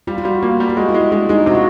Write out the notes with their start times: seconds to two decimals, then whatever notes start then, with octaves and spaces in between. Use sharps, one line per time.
0.07 G3 F4
0.18 F4
0.25 G3 F#4
0.43 A#3 F4
0.60 G3
0.69 F#4
0.77 G#3 F4
0.89 E4
0.94 G#3
1.00 E4
1.12 G#3 D4
1.29 G#3 D#4
1.46 C3 F#4
1.55 F4